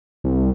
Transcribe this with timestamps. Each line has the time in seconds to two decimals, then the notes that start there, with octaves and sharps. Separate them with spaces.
0.24 C2